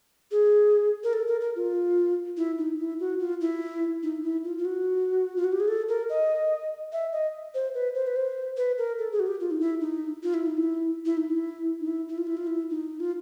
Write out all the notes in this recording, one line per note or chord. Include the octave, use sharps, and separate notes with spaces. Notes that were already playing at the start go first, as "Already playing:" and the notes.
G#4
A#4
A4
A#4
A#4
F4
E4
D#4
E4
F#4
F4
E4
D#4
E4
F4
F4
F#4
F4
F#4
G4
G#4
A4
A#4
D#5
E5
D#5
C5
B4
C5
B4
C5
B4
A#4
A4
G#4
F#4
G4
F4
D#4
E4
D#4
F4
E4
D#4
E4
E4
D#4
E4
D#4
E4
E4
F4
E4
F4
E4
D#4
F4